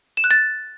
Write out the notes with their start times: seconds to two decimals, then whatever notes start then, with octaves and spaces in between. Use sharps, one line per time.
0.17 E7
0.24 F#6
0.31 A6